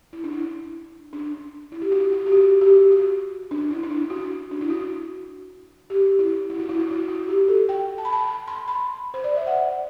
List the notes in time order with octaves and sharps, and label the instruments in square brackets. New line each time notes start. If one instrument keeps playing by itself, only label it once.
[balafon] E4
D4
E4
D4
E4
G4
F#4
F#4
G4
F#4
G4
F#4
D4
E4
D4
E4
F#4
D4
E4
F#4
G4
E4
E4
F#4
E4
F#4
E4
F#4
G4
A4
G5
A5
B5
A5
B5
C6
B5
C5
D5
E5
F#5